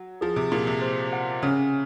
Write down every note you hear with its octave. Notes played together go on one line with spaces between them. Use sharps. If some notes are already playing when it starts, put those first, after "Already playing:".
Already playing: F#3
F3 G#4
C3
A#2 G#4
C3
C5
F#5
C#3 C#4